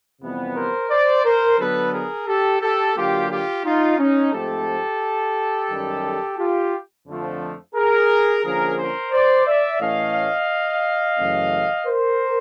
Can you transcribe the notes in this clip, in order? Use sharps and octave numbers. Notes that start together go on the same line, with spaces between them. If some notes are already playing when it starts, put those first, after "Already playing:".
F2 C3 E3 G3 B3
A#4 C5
C5 D5
A#4 C5
D3 F#3 B3 A4 B4
G#4 A#4
G4 A4
G4 A4
D3 F#3 A#3 F4 G4
F4 G4
D#4 F4
C#4 D#4
G#2 F3 A3 C4 G4 A4
F#2 D#3 G3
F4 G4
F2 D3 F3 A3
G#4 A#4
D3 F3 A#3 C#4 G#4 A#4
A#4 C5
C5 D5
D5 E5
A2 E3 A3 C#4 D#5 F5
F#2 C#3 E3 A3 C#4
A#4 C5